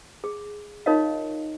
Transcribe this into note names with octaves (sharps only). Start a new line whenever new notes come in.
G#4
D#4 F4 A#4 C#5 D#5 F5